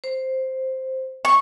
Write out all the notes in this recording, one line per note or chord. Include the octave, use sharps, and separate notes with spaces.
C5
C#6